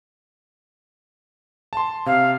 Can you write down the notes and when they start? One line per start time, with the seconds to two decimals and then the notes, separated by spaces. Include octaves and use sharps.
1.73 A5 C6
2.06 C3 F5